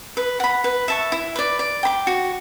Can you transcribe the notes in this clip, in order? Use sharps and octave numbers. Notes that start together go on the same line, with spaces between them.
B4
F#5 B5
B4
E5 A5 C#6
E4
B4 D5
D5
G5 B5 D6
F#4